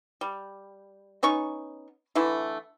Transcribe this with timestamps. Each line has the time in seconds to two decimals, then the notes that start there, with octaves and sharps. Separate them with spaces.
0.21 G3
1.23 B3 C#4 D#4 C#6
2.15 D3 E3 A3 E4